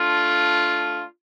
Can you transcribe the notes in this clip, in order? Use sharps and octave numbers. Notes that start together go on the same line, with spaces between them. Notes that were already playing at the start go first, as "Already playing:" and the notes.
Already playing: A3 D4 F4